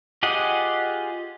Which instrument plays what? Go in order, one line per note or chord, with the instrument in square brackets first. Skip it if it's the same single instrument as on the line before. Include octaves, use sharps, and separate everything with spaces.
[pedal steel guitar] F4 G4 G#4 D#5 F#5